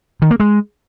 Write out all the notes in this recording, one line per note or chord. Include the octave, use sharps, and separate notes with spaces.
D#3
A#3
G#3